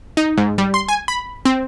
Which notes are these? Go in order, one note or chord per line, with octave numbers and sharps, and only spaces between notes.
D#4
G#2
G3
C6
G#5
B5
C4